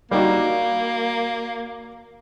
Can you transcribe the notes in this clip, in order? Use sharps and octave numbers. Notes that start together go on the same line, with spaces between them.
G3 A#3 D#4 F#4